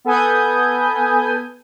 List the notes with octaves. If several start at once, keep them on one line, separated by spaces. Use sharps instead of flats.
B3 A4 B4 G#5 D#6 G6